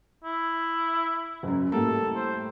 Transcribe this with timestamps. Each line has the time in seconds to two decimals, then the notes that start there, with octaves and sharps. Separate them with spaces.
0.24 E4
1.43 F#1 F#2
1.72 A2 G3 A#3 A4
2.16 C5